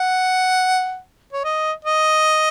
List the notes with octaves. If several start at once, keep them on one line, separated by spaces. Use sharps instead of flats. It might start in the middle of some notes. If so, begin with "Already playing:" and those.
Already playing: F#5
C#5
D#5
D#5